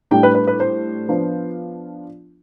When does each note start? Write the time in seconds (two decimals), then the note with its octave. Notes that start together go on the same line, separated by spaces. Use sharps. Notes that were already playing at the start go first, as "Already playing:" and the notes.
0.11 A2 G3 D4 G5
0.23 B4
0.35 B4
0.47 B4
0.60 C5
1.08 F3 B3 D4 F4